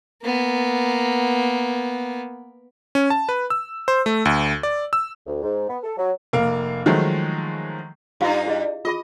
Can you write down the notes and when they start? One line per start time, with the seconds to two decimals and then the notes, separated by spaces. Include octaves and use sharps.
0.23 A#3 B3
2.95 C#4
3.10 A5
3.29 B4
3.50 E6
3.88 C5
4.06 A3
4.25 D2
4.63 D5
4.93 E6
5.26 D2
5.42 G#2
5.69 B3
5.83 A4
5.97 F#3
6.33 F1 A#3 F5
6.86 D#3 F3 F#3 G#3 A3
8.21 G2 D#4 F4 G4 F5
8.46 E4 G#4 D#5
8.85 F4 G#4 D#5 B5